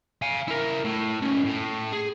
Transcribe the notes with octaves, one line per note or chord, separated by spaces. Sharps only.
F5 G#5
E4 A#4
A2
D#2 C#4
A2
G#4